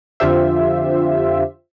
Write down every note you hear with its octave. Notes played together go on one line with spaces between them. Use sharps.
F2 D3 F4 G4 C5 E5